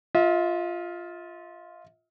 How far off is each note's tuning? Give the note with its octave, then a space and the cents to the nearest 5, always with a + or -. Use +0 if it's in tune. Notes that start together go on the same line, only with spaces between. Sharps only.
F4 +0 E5 -45